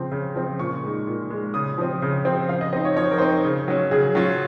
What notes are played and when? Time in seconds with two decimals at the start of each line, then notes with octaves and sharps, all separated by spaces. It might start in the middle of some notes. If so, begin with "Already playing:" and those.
Already playing: C#3 F3 C4
0.11 C#3
0.35 F3 C4
0.59 A#2 C#6
0.83 G#3 D#4
1.07 A#2
1.30 G#3 D#4
1.54 C#3 D#6
1.78 F3 C4
2.02 C#3
2.25 F3 C4
2.49 F3 F5
2.61 D#5
2.73 C4 D#4 D#5
2.85 C#5
2.96 F3 C#5
3.04 C5
3.11 A#4
3.18 C4 D#4 C5
3.44 C#3
3.68 F#3 C#4
3.91 C#3 G#4
4.15 F#3 C#4 F4